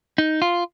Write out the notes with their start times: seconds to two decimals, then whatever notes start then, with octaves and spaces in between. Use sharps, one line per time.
0.18 D#4
0.42 F4